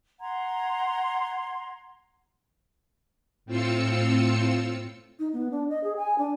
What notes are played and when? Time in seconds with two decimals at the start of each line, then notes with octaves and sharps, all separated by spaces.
0.21 F#5 A#5 C6 G#6
3.46 A2 C4 F4 E6 C#7
5.19 D#4
5.33 B3
5.51 D4
5.69 D#5
5.84 G#4
5.97 G#5
6.18 D4